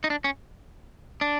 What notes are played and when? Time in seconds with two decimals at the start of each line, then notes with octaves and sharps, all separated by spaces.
0.04 D#4
0.10 D4
0.24 C#4
1.21 D4